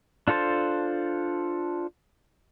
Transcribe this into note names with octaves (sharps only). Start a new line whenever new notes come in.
D4 F4 A4 C5 A5